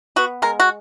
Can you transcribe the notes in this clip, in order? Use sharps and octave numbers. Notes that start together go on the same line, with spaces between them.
B3 F#4
G#3 A#4
F#4